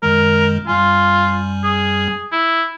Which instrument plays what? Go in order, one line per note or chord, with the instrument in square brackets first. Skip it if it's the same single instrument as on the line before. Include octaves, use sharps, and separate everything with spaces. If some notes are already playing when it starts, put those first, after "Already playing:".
[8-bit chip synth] F#2 D#3 G#3 [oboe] A#4
[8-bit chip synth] F#2 G3 G#5 [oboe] F4
[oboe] G#4
E4